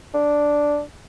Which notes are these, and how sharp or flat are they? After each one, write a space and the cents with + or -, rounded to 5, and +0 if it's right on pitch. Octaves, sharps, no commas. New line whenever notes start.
D4 +0